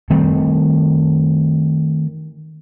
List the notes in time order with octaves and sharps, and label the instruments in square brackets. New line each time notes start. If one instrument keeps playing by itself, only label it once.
[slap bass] D#3 G3 A3 C4